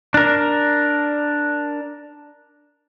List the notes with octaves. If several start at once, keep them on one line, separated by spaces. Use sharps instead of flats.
D4 A#4